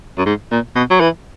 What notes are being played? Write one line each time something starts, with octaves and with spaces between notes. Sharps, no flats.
F#2
G#2
A#2
B2
F#3
E3